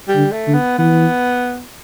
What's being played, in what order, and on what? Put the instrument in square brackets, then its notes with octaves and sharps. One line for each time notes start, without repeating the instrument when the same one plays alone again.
[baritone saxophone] G3
[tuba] D3
[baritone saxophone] A3
[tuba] D3
[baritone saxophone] B3
[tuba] E3 [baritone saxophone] B3